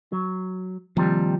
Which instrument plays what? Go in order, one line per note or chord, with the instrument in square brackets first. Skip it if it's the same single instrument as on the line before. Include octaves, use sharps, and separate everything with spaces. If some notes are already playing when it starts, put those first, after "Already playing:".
[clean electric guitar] F#3
[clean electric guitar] D#2 C3 G3 [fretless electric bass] F3